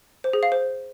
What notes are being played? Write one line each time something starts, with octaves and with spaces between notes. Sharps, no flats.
C5
G#4
F5
C5